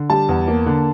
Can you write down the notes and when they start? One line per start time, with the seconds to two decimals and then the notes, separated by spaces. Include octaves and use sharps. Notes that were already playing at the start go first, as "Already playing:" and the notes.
Already playing: D3
0.10 G3 A5
0.29 E2
0.48 A#3
0.66 D3